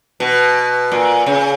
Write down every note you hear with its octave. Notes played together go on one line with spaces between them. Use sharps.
B2
A#2
C#3